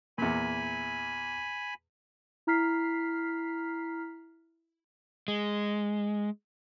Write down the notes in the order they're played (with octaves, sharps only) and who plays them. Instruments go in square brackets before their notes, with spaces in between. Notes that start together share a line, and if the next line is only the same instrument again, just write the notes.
[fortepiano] E2 A#2 [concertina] G#5 B5
[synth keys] E4 A#5 F6 B6 C7
[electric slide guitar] G#3